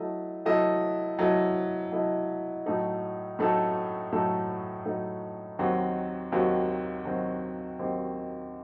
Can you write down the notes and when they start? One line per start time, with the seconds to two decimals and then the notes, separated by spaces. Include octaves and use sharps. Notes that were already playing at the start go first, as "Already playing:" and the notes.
Already playing: F#3 A3 E4 A4 D#5
0.46 F#3 A3 E4 A4 D#5
1.19 F#3 A3 E4 A4 D#5
1.92 F#3 A3 E4 A4 D#5
2.66 A2 F#3 A3 D#4 A4
3.39 A2 F#3 A3 D#4 A4
4.12 A2 F#3 A3 D#4 A4
4.85 A2 F#3 A3 D#4 A4
5.59 D#2 D#3 F#3 C4 F#4
6.32 D#2 D#3 F#3 C4 F#4
7.05 D#2 D#3 F#3 C4 F#4
7.79 D#2 D#3 F#3 C4 F#4